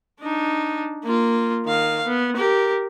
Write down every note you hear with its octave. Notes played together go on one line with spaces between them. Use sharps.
D4 D#4
A#3 F4
D#3 F5
B3
G4 A#4